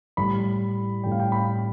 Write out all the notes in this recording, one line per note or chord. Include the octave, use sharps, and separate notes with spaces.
A2 G3 B5
A2 G3 G5
F5
G5
B5